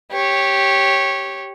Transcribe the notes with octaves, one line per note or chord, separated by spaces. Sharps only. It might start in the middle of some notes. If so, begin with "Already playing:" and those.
G4 C#5